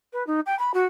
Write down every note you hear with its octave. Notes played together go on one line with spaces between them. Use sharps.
B4
D#4
G5
B5
F#4